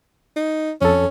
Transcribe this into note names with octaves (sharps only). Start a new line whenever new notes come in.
D#4
F2 C#4 A4